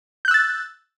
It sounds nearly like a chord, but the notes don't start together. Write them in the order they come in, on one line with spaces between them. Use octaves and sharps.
G6 F#6 E6 A6